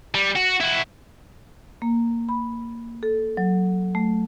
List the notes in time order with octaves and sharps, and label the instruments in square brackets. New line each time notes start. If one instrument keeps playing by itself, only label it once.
[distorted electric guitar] G3
F#4
E4 F#4
[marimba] A#3
B5
A4
F#3
A3